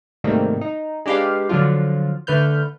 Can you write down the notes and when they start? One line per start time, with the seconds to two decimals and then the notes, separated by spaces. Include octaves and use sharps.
0.24 G#2 C3 D#3 G3 A3 A#3
0.61 D#4
1.06 G#3 D4 G4 B4 F5
1.49 D3 F3 F#3 D4 F4
2.27 D3 A3 B4 F6 G6